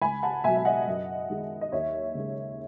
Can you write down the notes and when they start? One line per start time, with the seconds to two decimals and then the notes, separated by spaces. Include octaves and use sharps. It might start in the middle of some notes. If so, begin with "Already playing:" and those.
0.02 C#2 G#5 B5
0.23 F#5 A5
0.44 B2 F#3 E5 G#5
0.57 E5
0.65 D#5 F#5
0.87 F#2
1.30 D#3 G#3
1.61 D#5
1.72 D#2 C#5 E5
2.15 C#3 G#3